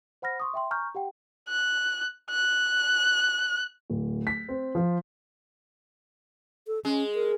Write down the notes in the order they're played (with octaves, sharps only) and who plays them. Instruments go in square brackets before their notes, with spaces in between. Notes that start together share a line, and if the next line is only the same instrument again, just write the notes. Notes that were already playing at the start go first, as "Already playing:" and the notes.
[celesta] C5 F#5 B5 F6 A#6
C6 C#6 D#6
E5 G5 C6
G#5 A#5 C#6 F6 G6
G4 F#5 G5
[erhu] F#6
F#6
[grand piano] D1
B6
C4
F3
[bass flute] A4
[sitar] G#3 [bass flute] C#4
[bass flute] A#4